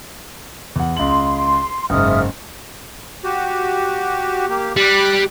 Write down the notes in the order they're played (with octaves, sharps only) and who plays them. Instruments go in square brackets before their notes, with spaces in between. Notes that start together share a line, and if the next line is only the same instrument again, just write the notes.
[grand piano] E2 F#5
[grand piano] C#2 F#7 [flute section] C6
[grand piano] F#1 G#2 [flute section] E5 D#6 F6
[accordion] F#4 G4
A#3 G4
[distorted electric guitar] G3 [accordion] B5 F#6